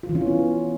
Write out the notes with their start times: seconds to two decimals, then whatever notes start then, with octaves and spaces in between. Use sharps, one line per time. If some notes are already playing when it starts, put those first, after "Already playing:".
0.03 F4
0.09 E3
0.15 C#4
0.21 F4
0.27 B3